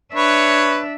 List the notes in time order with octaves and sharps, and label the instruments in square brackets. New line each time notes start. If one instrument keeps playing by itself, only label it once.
[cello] D4 E5 [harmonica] B4 C#5